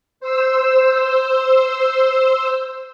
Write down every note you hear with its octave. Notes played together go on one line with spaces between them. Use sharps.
C5 E6